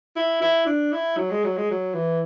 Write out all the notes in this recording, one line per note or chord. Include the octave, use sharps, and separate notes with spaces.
E4
E4
D4
E4
F#3
G#3
F#3
G#3
F#3
E3